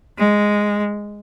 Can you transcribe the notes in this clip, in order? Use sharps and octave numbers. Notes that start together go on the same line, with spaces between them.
G#3